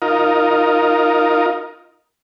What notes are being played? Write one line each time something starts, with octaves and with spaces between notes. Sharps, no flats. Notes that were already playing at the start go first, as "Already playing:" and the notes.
D#4 F4 A#4